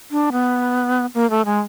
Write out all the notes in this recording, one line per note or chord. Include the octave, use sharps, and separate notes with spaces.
D4
B3
A#3
A3
G#3